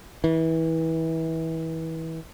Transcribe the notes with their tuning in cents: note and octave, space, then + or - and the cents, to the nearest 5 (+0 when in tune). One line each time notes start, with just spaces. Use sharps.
E3 -25